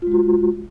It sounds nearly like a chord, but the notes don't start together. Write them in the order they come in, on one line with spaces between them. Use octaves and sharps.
F4 G#3 F#4